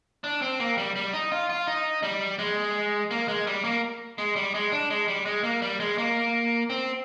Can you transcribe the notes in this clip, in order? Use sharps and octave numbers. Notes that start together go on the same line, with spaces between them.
D4
C4
A#3
G3
G3
D#4
F4
F4
D#4
G3
G#3
A#3
G#3
G3
A#3
G#3
G3
G#3
D4
G#3
G3
G#3
A#3
G3
G#3
A#3
C4